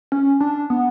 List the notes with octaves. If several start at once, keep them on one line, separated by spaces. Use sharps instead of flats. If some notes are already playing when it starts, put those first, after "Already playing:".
C#4
D4
B3